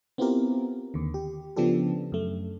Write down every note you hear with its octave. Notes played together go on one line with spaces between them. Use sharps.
B3 C4 E4 F4 G4 A#4
D#2 D3
G4
C#3 F3 B3 D4 G4 A4
F#2 A3